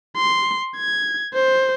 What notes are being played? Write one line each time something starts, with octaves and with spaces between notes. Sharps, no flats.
C6
G#6
C5